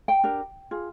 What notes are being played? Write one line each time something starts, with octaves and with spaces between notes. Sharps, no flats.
G5
D4 G4 A#4
F4 G#4